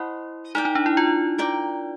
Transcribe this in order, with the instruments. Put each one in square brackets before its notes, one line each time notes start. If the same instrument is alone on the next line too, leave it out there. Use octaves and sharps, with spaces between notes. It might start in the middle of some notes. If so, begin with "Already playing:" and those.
Already playing: [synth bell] E4 [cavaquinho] C5 D#5 F#5 B5
[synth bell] D#4 [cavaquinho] A#4 D5 G5
[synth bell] D#4
D4
E4
F4
[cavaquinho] A#4 D5 G5 A#5